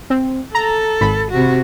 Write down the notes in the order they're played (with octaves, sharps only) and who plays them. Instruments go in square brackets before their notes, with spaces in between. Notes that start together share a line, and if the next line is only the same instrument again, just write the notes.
[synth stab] C4
[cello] A4 [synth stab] A#5
[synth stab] G#1 B5
[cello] C3 F#4